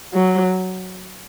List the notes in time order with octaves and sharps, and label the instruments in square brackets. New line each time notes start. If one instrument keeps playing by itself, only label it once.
[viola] F#3